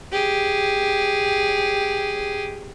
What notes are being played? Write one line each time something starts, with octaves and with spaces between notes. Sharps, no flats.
G4 G#4